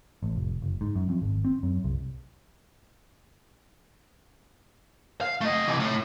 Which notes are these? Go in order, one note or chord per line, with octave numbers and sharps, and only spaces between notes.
A1
F1
F#1
G#2
F#2
F2
G#1
C4
F#2
C2
F5
A3 D#5
C3 E3
A2